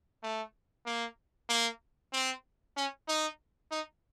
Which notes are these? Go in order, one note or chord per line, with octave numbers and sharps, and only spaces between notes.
A3
A#3
A#3
C4
C#4
D#4
D#4